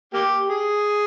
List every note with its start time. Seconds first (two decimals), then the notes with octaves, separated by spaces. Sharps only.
0.13 A#3 G4
0.50 G#4